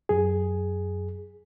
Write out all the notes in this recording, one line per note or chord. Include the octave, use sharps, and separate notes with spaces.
F#2 G#4